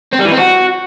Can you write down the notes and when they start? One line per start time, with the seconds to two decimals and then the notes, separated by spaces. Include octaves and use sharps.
0.13 C4
0.19 G3
0.25 E3
0.32 C4
0.38 F#4